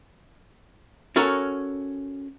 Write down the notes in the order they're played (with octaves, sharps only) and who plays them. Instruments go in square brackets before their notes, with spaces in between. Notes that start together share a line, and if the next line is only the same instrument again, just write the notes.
[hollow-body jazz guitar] C#4 F#4 A4 A#4 C#5